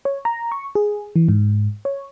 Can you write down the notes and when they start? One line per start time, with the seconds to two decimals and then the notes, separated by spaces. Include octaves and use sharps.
0.05 C#5
0.25 A#5
0.52 C#6
0.75 G#4
1.16 E3
1.29 G#2
1.85 C#5